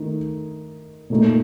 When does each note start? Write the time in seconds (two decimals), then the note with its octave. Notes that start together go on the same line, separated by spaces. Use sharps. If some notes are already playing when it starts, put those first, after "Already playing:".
Already playing: D#3 A3 D#4
1.10 A#2 A3 D#4